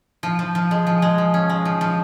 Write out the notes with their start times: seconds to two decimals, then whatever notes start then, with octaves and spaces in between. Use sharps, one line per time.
0.23 F3
0.39 F3
0.55 F3
0.71 G#3
0.87 F3
1.02 G#3
1.18 F3
1.34 C#4
1.50 G#3
1.65 F3
1.81 F3